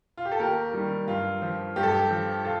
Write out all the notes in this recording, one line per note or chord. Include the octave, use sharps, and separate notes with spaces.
F4
G4
A4
D#2 G4 A#4
D#3 G3
G2 F4
F3
G2 G4
A4
G4
F3
F4 A4